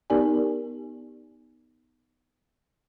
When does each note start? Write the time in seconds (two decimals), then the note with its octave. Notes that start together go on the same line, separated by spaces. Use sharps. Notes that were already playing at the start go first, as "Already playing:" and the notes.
0.10 B3 D#4 G4 A#4 D5 G#5